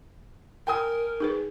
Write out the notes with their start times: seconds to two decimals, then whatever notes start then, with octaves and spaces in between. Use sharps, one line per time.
0.67 A#4 G5 G#5 D#6
1.20 D#4 G#4 B4